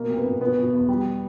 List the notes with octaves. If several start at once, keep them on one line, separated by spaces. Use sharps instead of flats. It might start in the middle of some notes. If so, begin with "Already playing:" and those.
Already playing: B2 A#3 A#4
C2
B3 B4
B2
B2 B3 B4
B2
E2
G3